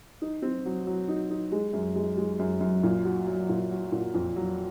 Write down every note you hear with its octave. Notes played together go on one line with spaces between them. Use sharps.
D#4
C4
F#3
F#3
D#4
D#4
G#3
F#2
G#3
G#3
F#2
F#2
A#2
F#4
F#3
A#2
F#3
A#2
F2
F#3